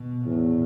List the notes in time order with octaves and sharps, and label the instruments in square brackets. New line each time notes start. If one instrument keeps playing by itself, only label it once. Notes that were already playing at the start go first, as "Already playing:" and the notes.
Already playing: [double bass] B2
[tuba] E2 [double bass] A2